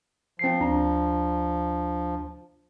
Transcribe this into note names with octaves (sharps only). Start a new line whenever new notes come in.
F3 C4 C7
D2 D4 A#5